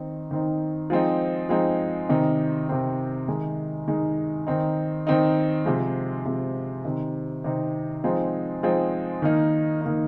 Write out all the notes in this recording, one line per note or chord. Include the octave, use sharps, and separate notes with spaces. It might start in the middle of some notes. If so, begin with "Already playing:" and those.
Already playing: D#3 C4 D#4
D#3 C4 D#4
F3 G#3 C4 D#4
F3 G#3 C4 D#4
C3 D#3 C4 D#4
C3 D#3 C4 D#4
D#3 G#3 D#4
D#3 G#3 D#4
D#3 C4 D#4
D#3 C4 D#4
C3 F3 G#3
C3 F3 G#3
C3 D#3 C4 D#4
C3 D#3 C4 D#4
F3 G#3 C4 D#4
F3 G#3 C4 D#4
D#3 A#3 D#4
D#3 A#3 D#4